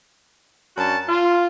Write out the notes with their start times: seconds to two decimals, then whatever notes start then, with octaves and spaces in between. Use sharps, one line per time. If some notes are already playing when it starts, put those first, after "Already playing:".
0.77 F#2 D4 F#4 A5
1.09 F4